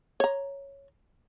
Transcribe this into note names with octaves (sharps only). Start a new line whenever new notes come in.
C#5 A#5